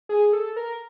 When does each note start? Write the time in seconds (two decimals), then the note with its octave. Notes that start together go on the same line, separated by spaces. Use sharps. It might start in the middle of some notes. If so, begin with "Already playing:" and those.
0.09 G#4
0.33 A4
0.56 A#4